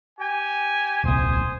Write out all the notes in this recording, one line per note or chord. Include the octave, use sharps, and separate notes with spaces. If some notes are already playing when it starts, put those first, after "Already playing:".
G4 G#5
D#1 C2 C5 G#5 D#6